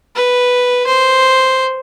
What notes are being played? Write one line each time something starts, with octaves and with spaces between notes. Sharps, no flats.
B4
C5